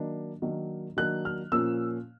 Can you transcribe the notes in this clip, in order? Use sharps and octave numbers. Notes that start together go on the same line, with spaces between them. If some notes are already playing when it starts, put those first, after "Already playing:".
Already playing: D#3 F#3 A#3 D4
D#3 F#3 A#3 D4
D#3 F#3 A#3 D4 F#6
F6
A#2 F3 A#3 C#4 E6